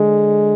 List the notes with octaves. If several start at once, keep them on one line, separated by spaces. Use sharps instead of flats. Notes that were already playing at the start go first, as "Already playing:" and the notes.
Already playing: D3 G#3